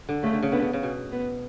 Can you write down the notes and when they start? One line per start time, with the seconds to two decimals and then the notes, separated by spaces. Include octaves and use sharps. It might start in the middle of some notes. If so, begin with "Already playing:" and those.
0.09 D3
0.23 C#3 A3
0.33 D3
0.42 C#3
0.52 D3 B3
0.62 C#3
0.73 C#3
0.83 B2
1.12 B3